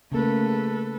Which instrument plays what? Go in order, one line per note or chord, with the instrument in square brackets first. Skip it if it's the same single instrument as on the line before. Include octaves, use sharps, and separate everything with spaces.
[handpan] C#3 A#3 [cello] A3 [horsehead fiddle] A4 B4